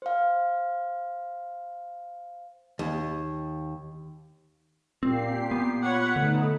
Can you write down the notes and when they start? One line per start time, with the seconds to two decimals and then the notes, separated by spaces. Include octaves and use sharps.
0.02 C5 F5
2.79 D#2
5.03 A#2 C4 G4 C7
5.51 B3
5.82 F4 C#5 F#5 B5 F#6 C#7
6.16 D3 A3 B3 D#4